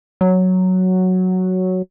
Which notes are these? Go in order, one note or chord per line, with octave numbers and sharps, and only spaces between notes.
F#3